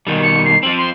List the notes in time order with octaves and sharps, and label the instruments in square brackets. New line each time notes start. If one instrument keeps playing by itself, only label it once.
[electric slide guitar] B2 D#3 G3
[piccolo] C#7
C7
[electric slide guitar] F3 C4 [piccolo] F#7
[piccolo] C6